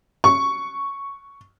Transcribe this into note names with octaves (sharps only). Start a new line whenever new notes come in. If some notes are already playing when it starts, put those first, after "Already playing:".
C#6